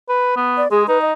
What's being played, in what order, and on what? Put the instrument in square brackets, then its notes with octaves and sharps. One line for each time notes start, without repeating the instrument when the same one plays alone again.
[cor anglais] B4
B3
[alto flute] D5
[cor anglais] G#3 [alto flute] G#4
[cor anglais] D#4 [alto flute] B4
[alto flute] D#5